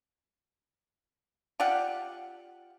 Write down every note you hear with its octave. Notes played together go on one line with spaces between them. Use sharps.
F4 G4 D5 F#5